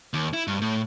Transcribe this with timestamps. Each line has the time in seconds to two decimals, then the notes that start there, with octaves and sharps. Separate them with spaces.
0.14 D#2
0.34 E4
0.47 G2
0.62 A2